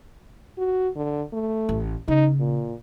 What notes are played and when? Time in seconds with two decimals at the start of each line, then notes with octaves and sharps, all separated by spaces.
0.58 F#4
0.96 D3
1.33 A3
1.69 A1
2.08 C#3 D#4
2.40 A#2